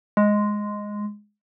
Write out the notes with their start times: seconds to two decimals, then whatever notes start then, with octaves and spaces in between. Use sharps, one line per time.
0.17 G#3